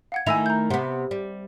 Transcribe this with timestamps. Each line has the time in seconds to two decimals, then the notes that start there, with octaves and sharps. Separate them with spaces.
0.12 F5 F#5 G#6
0.27 D#3 A3 E4 G#5 E6 F7
0.46 A#5 G6
0.70 C3 B3 F#5
1.11 G3